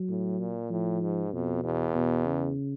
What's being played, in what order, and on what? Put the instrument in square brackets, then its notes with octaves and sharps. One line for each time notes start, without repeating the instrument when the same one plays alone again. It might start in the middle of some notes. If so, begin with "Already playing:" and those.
Already playing: [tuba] F#3
[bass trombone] A2
A#2
[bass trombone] A2 [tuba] F3
[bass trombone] G#2
[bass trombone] F2 [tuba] B2
[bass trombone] E2
[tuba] B2
C#3